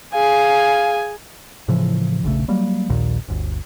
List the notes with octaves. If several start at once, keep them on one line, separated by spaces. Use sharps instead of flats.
G#4 F5 G#5
A2 C#3 E3 F3
E1 A#1 C#3 A3
F#3 G3 A#3
A#1 D#2 A#2
G1 D2